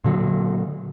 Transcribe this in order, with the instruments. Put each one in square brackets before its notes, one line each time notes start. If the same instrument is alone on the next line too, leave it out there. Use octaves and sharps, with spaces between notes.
[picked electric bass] A#2 D3 F#3